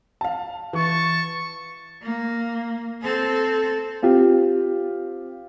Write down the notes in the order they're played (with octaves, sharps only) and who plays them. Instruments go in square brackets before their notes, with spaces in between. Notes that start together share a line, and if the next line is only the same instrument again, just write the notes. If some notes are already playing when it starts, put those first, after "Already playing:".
[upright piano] F5 A5
[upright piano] E3 [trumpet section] A5 C#6
[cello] A#3
C4 A4
[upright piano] C4 F4 G4